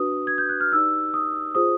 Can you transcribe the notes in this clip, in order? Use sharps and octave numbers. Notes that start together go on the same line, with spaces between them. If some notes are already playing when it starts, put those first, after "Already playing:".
Already playing: D4 F#4 B4 D#6
G#6
G6
F#6
F6
D#4 G4 B4 D5 E6
D#6
F4 G#4 C5 D#6